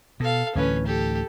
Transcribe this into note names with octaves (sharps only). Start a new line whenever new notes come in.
B2 A4 F5
D2 A2 E3 C#4 B4
G4 A4